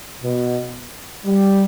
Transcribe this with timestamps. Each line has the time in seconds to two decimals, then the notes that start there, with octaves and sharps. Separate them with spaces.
0.22 B2
1.25 G3